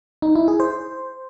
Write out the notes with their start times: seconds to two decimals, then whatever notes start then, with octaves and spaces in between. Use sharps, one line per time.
0.22 D#4
0.35 E4
0.48 G#4
0.60 C5